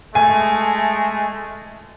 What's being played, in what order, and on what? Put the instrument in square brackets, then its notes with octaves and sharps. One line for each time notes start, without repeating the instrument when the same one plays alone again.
[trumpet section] G#3 A3 [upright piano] G#5